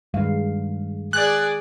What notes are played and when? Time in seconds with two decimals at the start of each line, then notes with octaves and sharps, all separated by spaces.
0.14 G2 D#3 G#3 F5
1.13 G#4 D5 F#6